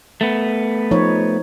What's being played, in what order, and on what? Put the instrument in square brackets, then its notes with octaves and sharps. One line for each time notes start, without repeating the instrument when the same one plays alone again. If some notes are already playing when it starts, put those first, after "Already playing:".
[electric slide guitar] A3 B3
[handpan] F3 D#4 C#5